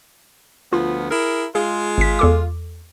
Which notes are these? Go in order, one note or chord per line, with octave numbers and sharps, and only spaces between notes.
D2 F3 B3 F4
E4 G#4 A#4
G#3 F4 G#4
G#1 B6
E2 A4 D6